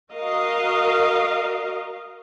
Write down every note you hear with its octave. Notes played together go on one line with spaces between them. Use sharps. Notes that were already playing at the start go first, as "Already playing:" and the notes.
F#4 A#4 D#5 F5